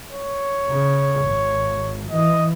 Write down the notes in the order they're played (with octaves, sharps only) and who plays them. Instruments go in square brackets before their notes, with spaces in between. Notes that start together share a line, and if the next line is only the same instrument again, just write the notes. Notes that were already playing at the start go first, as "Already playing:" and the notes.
[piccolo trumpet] C#5
[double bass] C#3
G#1
[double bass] E3 [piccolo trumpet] D#5